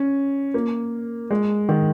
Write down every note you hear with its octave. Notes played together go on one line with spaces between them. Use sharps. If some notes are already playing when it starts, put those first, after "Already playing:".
Already playing: C#4
A#3
G#3
D#3